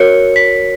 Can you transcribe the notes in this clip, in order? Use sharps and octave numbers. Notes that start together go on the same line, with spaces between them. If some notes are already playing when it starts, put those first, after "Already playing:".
Already playing: F#4 A#4 C#5 C#7
B6